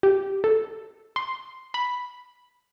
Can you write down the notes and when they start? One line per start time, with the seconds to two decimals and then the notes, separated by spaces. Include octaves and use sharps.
0.03 G4
0.44 A4
1.16 C6
1.74 B5